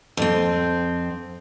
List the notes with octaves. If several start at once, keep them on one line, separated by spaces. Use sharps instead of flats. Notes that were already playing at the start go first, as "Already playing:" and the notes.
F2 C4